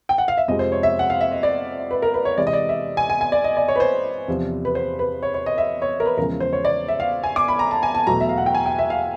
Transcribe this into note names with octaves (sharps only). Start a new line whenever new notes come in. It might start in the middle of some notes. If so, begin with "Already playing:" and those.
G5
F#5
F5
E5
F2 C3 F3 G#3 D#5
C5
C#5
E5
F#5
F5
E5
D#5
D5
B4
A#4
B4
C#5
C3 E3 G#3 D5
D#5
D5
E5
G#5
G#5
G#5
D5
D#5
D5
C#5
B4
C5
E2 C3 F3
B4
C5
B4
C#5
C#5
D#5
E5
C#5
A#4
B4
E2 C#3 F3 G#3 A#4
C5
C#5
D5
E5
F5
G#5
D6
B5
A#5
A5
G#5
A5
E2 B2 F#3 A3 A#5
E5
F5
F#5
G5
G#5
G5
E5
F5